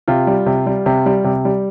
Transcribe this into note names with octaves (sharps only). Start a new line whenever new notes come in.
C3 F4
G3
C3
G3
C3
G3
C3
G3